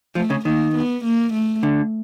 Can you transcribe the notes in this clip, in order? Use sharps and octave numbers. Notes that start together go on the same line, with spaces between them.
F3 A3
C#3
D#3 A#3
B3
A#3
A3
D3